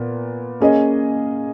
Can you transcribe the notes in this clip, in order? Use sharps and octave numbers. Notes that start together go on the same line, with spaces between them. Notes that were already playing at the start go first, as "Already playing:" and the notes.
Already playing: A#2 B3
A#3 C#4 G#4 D#5